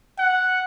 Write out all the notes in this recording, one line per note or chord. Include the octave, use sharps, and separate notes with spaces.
F#5